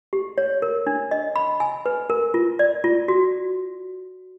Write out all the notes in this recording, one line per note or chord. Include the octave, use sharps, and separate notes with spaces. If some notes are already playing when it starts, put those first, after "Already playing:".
G4
C#5
A#4
D4
D#5
B5
G#5
B4
A#4
F4
D5
F4
F#4